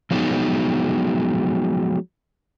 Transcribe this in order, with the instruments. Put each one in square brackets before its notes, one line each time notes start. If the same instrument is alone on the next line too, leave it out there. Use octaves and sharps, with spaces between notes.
[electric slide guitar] F3 F#3 G#3 B3 D#4